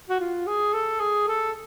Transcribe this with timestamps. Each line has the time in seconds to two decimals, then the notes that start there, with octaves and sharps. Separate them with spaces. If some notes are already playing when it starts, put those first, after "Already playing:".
0.09 F#4
0.20 F4
0.47 G#4
0.74 A4
1.00 G#4
1.28 A4